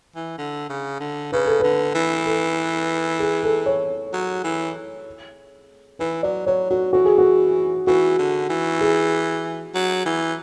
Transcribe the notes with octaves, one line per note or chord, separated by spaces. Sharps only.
E3
D3
C#3
D3
C#3 B4
A4
D3 B4
E3
A4
G#4
A4
C#5
F#3
E3
E3 B4
F#3 D5
F#3 C#5
F#3 F#4
E3 F#4
G#4
F#4
E3 F#4
D3
E3
G#4
F#3
E3